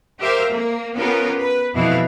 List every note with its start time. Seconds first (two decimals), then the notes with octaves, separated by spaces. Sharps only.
0.20 G4 A#4 C5 E5 F5
0.52 A#3
0.96 B3 C#4 F4 G4 A#4
1.40 B4
1.74 F2 B2 E3 E4 F5